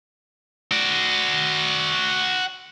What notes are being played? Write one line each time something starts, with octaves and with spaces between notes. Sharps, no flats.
F#4 D5